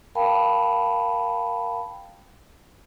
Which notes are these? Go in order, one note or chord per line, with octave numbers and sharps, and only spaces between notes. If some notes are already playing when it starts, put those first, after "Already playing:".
A#4 F5 G5 A5 B5